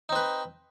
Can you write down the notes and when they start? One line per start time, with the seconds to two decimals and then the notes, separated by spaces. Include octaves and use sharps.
0.09 D#4
0.12 C4
0.16 B4